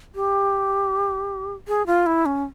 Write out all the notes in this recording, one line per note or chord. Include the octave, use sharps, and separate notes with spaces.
G4
G#4
F4
E4
C#4